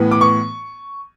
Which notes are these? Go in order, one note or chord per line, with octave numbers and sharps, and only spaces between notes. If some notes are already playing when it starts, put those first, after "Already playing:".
Already playing: A2 E3 B3
D6
C#6